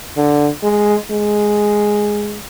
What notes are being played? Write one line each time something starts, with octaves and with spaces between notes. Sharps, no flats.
D3
G#3
G#3